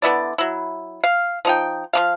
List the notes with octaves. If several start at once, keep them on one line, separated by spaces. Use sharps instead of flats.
D3 B3 E4 D5
F#3 E4
F5
F3 D#4 G5
F3 D4 F5